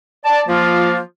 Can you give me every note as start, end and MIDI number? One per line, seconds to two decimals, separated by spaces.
0.25 0.41 74
0.25 0.41 81
0.47 0.99 53
0.47 0.99 58
0.47 0.99 65